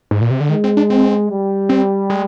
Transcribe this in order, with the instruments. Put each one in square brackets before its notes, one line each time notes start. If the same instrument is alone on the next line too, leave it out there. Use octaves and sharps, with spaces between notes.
[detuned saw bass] G#2
A#2
C3
D3
[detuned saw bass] D#3 [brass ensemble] G#3
[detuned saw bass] C4
D4
C4
[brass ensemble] G3
[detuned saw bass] C4
G#3